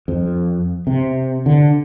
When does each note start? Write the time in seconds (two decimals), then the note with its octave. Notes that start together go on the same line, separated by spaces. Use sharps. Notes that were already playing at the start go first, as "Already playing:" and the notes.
0.08 F2
0.87 C3
1.46 D3